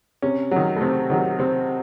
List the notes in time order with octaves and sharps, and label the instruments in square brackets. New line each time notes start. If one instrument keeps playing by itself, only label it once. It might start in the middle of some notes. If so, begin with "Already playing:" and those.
[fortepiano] C3 C#4
D#3 F#3
A3
C3 C4
D#3 F#3
C3 C4